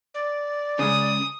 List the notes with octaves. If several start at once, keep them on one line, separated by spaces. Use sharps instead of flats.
D5
C#3 G#3 D#6